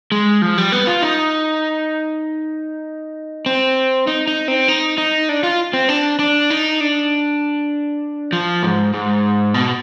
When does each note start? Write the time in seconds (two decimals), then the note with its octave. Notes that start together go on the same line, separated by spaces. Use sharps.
0.12 G#3
0.42 F3
0.58 G3
0.72 B3
0.87 F4
1.03 D#4
3.46 C4
4.07 D#4
4.28 D#4
4.48 C4
4.68 D#4
4.98 D#4
5.29 D4
5.43 F4
5.73 C4
5.89 D4
6.19 D4
6.50 D#4
6.81 D4
8.33 F3
8.62 G#2
8.94 G#2
9.54 B2